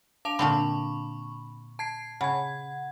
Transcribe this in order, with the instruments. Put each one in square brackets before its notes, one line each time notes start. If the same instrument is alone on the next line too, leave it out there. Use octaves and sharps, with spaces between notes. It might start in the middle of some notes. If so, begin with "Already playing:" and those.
[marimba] D4 [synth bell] F5 A5 F7
[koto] A#2 D3 C4 [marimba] G5 A5 [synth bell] B5 C#6
[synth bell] A5 G#6 C7
[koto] C#3 [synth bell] F#5 G#6 [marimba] B5